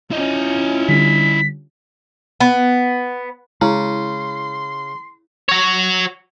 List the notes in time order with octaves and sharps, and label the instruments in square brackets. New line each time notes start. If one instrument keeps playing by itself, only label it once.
[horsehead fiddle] C#4 F4 [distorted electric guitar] E4 D#5
[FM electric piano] D3 G3 [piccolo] B6
[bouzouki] B3
[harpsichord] C#3 [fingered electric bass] G#3 [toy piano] E4 [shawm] C6
[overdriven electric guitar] F#4 C#5